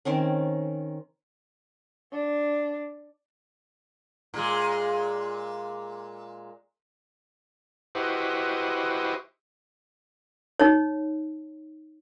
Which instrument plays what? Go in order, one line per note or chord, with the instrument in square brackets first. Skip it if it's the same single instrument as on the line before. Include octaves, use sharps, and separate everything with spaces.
[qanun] D#3 C4 C#4
[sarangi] D4
[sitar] A#2 G#3
[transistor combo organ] E4 F#4 G4 B4 C5 D#5
[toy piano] D#4 C#5